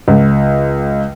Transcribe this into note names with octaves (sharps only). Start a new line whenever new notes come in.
C#2